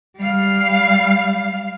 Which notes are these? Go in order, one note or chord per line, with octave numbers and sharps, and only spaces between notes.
G3 F5